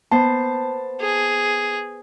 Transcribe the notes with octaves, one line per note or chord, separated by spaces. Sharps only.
B3 C5 A5
G#4